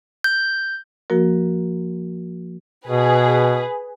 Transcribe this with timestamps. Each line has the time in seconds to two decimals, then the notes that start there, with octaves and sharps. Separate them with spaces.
0.24 G6
1.10 F3 A#3 F#4 A#4
2.88 B2 G#4 B4